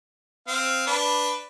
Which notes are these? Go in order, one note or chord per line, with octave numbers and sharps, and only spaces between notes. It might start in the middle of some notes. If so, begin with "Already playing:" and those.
C4 F5
D4 B4